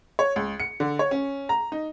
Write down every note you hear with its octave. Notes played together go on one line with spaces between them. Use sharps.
C#5
C#2
C#7
D3
C#5
C#4
A#5
D#4